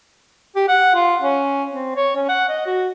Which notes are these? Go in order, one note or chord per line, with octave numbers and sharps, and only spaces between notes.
G4
F#5
F4
C#4
C4
C#5
C#4
F#5
D#5
F#4